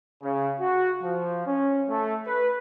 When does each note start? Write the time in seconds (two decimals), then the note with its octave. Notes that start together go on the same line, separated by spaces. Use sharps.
0.23 C#3
0.60 F#4
1.03 F3
1.46 C#4
1.89 A3
2.26 B4